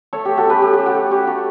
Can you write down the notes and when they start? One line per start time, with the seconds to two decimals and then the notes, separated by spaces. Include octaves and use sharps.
0.13 A3 A4 C#5
0.25 A3 G4
0.37 F#4 A4
0.45 C#4 G4 B4
0.62 C#4 G4
0.74 C#4 G4
0.86 F#4
0.94 A3
1.11 C#4 G4
1.27 A3 F#4 A4